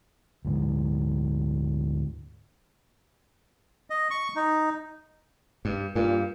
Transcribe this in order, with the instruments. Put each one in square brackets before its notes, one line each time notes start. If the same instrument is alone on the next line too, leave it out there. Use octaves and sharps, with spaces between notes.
[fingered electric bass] D2 G#2
[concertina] D#5
C#6
D#4
[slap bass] G2
[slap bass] G2 [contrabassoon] A#2